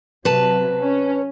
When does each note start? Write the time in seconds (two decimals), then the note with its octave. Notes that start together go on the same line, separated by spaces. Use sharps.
0.25 C3 F#3 B4 A5
0.82 C#4